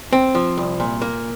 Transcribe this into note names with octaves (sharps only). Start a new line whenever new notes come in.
C4
F3
C2
A#2
A#3